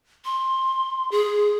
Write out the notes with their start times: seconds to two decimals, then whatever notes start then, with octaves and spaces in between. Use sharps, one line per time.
0.25 C6
1.11 G#4